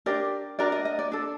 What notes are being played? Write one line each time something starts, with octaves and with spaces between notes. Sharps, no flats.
D4 G4 A#4 D5
D4 F#4 A#4 D5
D#5
D#5
D5
D4 A4 D5